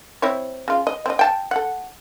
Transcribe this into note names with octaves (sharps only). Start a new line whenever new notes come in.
C4 E4 C#5
C#3 F4
D#5
C4 D#5
G5 A5
A4 F#5